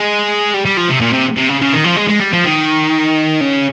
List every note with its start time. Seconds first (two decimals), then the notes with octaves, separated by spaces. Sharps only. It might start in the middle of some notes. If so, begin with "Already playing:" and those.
Already playing: G#3
0.54 G3
0.65 G3
0.77 F3
0.90 C3
1.01 A#2
1.13 C3
1.37 C3
1.49 C#3
1.62 C#3
1.73 D#3
1.85 F3
1.97 G#3
2.10 G#3
2.21 G3
2.33 F3
2.45 D#3
3.41 C#3